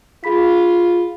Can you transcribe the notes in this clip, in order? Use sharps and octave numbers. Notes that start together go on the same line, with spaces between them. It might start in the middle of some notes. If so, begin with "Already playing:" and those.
F4 G#4 B5 B6